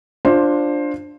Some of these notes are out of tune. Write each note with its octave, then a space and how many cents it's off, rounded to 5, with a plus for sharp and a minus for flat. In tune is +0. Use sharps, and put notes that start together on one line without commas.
D4 +5 F4 +0 C5 +15